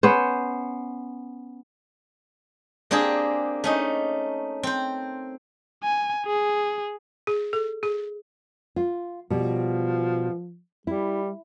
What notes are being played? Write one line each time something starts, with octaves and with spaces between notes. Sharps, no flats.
B3 C#4 C5
A#3 C4 D4 G4 G#4
A3 C#4 D#4
C4 C5
G#5
G#4
G#4
A4
G#4
F4
B2 F3 G3
G3 E4